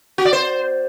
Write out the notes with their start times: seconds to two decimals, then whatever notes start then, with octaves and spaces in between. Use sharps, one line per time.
0.18 F#4
0.25 D5
0.33 C5